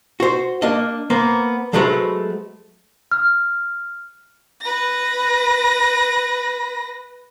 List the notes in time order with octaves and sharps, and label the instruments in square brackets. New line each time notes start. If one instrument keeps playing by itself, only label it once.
[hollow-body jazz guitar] F#4 C5
A#3 D4 D#5
A#3 B3 C5
F#3 G#3 A3 F#4 B4 C5
[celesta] F6
[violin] B4 A#6